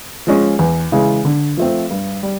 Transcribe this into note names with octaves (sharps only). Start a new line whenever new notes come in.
F3 G#3 C#4
E2
C#3 E3 G#3
D3
F3 A3 C4
G2
G3